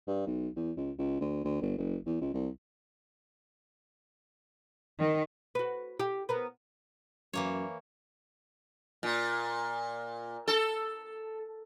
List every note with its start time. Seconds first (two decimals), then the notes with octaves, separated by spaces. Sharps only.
0.07 G2
0.27 B1
0.56 E2
0.77 C#2
0.99 C#2
1.21 D2
1.45 D2
1.61 G1
1.78 F#1
2.06 E2
2.21 C#2
2.34 C2
4.99 D#3
5.55 F#4 B4
5.99 G4
6.29 B3 A#4 B4
7.33 F#2 E3 A#3 C#5
9.03 A#2
10.48 A4